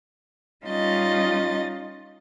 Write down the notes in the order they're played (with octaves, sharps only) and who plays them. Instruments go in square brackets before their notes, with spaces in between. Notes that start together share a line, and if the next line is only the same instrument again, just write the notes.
[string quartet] G3 C#4 D#4 F4 D#5 A6